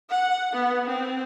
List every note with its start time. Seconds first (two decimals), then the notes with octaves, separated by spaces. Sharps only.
0.10 F#5
0.53 B3
0.87 C4